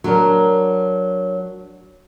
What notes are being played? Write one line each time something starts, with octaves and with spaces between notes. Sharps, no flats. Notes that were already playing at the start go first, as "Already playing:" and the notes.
F#3 D4 A#4